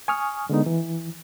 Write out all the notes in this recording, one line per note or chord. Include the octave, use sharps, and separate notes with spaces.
G#5 C#6 D#6 F6
D3 G#3 B3 D#4
E3